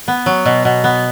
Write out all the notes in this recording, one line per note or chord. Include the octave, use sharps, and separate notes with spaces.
B3
F#3
B2
B2
B3